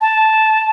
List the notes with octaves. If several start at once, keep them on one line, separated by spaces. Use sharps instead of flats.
A5